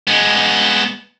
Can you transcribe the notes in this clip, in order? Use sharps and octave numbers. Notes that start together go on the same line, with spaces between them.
G#3 B3